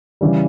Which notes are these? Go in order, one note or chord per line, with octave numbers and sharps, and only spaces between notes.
C#3 E3 G3